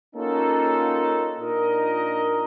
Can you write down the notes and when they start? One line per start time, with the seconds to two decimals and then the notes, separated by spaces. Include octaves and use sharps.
0.15 A#3 C#4 D#4 F4 F#4 A4
1.40 A#2 D4 D#4 A#4 D#5